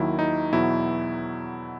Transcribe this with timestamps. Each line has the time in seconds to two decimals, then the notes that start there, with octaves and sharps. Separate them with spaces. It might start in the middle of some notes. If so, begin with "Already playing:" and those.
Already playing: D#2 D#3 F#3 E4
0.19 D#4
0.52 E2 B2 F#3 E4